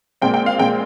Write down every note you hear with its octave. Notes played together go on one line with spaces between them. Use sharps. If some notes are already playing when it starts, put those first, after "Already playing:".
A#2 G#3 C4 G5
G5
F5
A#2 G#3 C4 G5